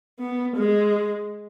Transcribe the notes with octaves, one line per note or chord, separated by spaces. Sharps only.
B3
G#3